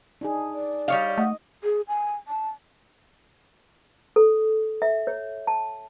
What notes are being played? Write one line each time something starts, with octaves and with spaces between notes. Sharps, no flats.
D4 D#4 G#4
D5
G3 C#5 D#5 F5
A3 D#5 F#5
G#4
G#5
A5
A4
E5
C#5
A5